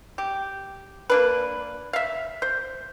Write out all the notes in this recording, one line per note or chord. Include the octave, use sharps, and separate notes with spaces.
G4
A#3 D4 B4
E5 F5
C5